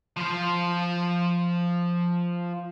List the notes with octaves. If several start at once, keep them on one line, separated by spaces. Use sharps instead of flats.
F3 C5